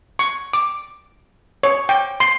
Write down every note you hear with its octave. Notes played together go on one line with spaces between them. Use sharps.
C#6
D6
C#5
G5
C6